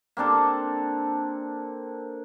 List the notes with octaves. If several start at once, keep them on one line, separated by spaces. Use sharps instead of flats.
A#3 C4 D4 A4